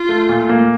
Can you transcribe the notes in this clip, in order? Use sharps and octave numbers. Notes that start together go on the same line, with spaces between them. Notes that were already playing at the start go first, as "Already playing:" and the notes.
Already playing: F4
A3
A#2
A#3